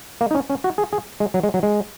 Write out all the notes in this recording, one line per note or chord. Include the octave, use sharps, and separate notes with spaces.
A#3
D#4
C#4
C#4
F#4
G#4
G#4
G#3
F#3
G#3
F#3
G#3